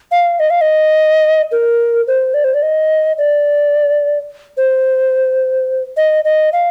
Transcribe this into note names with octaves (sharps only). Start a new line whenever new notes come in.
F5
D#5
F5
D#5
A#4
C5
D5
C5
D5
D#5
D5
C5
D#5
D#5
F5